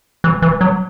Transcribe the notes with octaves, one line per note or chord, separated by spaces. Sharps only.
E3
E3
F#3